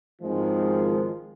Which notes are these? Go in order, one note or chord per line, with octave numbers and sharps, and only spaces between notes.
G#1 D#3 F3 G#3